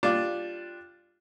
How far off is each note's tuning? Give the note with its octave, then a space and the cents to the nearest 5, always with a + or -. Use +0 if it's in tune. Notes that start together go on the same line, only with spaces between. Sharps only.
G3 +0 D4 +0 F4 +0